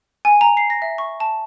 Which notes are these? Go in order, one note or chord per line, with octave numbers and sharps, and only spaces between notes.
G#5
A#5
C7
A#6
E5
C#6
A5